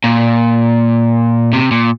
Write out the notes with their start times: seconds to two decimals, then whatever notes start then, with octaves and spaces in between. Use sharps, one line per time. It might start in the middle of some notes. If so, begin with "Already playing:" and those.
0.04 A#2
1.53 C3
1.71 A#2